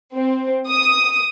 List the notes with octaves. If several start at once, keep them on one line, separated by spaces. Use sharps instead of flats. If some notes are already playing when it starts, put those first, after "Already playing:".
C4
D#6